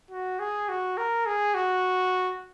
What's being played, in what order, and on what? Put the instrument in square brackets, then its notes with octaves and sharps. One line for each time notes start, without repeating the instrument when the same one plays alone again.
[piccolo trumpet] F#4
G#4
F#4
A#4
G#4
F#4